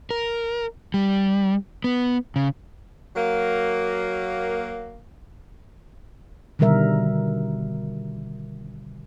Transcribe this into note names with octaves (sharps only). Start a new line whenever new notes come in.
A#4
G3
B3
C#3
F#3 A#3
B2 D3 D#3 G3 A#4 E5